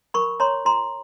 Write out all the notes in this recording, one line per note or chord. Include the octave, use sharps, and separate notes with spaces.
A#4 B5 C#6
C#5 A#5 C6
F4 A#5 C6